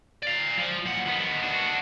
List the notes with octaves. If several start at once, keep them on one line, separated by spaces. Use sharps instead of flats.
D5 F5
F3
A#2 F#5
D#3 B3
D4 F#4